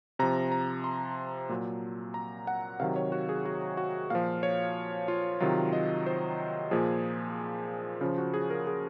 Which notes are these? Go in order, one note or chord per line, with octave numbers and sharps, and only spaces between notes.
C3 F3 A#5
A#5
C6
A#2 F#3
A#5
F#5
C3 D#3 F#3 F5
C#5
F#4
G#4
F#4
F#4
A#2 F3 F5
C#5
F4
C3 D#3 F#3 F4
D#5
C5
A#2 F3 G#4
C#3 F3 F4
F#4
G#4
A#4
G#4